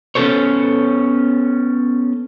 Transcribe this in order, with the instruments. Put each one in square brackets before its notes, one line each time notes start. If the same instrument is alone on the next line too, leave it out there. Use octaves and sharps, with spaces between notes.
[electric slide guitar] B3 C#4 F#4 A4 C5 C#5